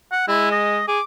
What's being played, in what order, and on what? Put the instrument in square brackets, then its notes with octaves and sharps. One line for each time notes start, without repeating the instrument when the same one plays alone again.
[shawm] F#5
[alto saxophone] G#3 [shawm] E4
[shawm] D#5
[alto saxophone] G#4 [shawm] D6